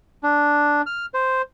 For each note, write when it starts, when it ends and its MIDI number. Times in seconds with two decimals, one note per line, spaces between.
0.23 0.82 62
0.86 1.06 89
1.14 1.42 72